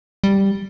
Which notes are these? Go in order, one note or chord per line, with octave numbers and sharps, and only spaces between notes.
G3